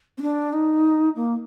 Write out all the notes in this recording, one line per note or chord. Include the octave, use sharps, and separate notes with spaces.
C4
D4
D#4
A#3